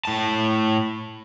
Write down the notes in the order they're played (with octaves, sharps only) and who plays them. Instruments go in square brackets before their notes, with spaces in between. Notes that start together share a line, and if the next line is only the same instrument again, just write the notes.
[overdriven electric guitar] A2 A5